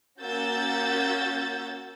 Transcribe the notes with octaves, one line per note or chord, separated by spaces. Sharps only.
A#3 C#4 F#4 E6 G6 A6